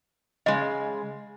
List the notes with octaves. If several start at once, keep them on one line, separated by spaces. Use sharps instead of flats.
C#3 G#3 D#5